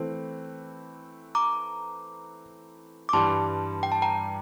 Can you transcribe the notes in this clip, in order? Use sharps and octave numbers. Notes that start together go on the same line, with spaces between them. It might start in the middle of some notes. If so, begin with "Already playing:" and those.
Already playing: E3 A3 C4
A#5 D6
D6
G2 E3 G3 A5 C6
G5
A5
G5 A#5